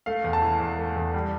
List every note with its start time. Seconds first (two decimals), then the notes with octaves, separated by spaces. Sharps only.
0.06 A3 F5
0.24 E2
0.33 A5
0.42 E3
0.60 E2
0.78 A3
0.96 E2
1.14 G3